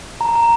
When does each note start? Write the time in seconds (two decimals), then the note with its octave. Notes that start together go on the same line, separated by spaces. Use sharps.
0.21 A#5
0.35 A#5